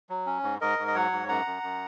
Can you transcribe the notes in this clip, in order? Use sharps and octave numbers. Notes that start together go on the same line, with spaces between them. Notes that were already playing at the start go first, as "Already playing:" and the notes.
F#3
C#4
G#2
G#2 A#4 D#5
G#2
D#5
F#3 C#5 F#5
G#2
F#2 F#5 A#5
F#2
F#2